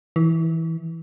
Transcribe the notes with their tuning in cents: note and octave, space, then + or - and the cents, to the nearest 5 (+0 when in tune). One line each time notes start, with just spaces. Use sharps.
E3 -15